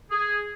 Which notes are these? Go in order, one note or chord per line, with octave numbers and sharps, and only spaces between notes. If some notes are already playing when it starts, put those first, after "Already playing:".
G#4